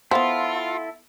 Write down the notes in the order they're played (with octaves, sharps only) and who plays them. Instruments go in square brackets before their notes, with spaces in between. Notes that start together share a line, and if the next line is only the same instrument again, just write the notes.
[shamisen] B3 C5 [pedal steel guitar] E4 A4 [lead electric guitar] F4 [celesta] F5 F#5 C6